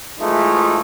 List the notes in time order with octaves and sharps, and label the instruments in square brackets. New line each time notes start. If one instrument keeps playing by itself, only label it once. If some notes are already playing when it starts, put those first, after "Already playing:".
[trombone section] E3 F3 G#3 A3 D#4 E4